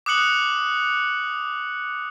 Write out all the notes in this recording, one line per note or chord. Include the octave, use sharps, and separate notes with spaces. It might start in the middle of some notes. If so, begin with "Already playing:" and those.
D6 D#6 F#6 C#7 F#7